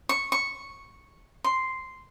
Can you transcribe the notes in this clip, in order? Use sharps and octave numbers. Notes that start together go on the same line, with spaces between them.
C#6
C#6
C6